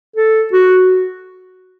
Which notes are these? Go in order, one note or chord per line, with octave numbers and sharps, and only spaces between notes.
A4
F#4